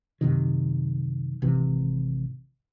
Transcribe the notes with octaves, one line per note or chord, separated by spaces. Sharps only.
F#2 C3 D#3
G#1 C3 E3